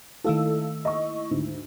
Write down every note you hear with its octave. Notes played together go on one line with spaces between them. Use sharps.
D#3 A3 E4 A4 F5 E6
D#5 C#6
D2 G#2